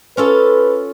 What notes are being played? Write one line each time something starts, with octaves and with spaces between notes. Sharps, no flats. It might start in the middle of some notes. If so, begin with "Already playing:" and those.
C#4 F4 A4 B4